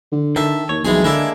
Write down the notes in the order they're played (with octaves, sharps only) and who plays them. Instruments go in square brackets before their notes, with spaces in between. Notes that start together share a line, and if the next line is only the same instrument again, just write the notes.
[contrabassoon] D3
[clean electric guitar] D#3 E5 [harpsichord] A4
[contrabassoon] D#2 [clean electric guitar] C#5
[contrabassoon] B1 [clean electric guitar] F2 [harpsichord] E3 G#3 G#4
[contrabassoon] D3 [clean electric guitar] G#3 A#3 D4 [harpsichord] E4 A4